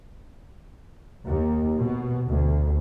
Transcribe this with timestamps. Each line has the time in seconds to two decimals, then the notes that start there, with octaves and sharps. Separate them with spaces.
1.25 D#2
1.78 B2
2.26 D2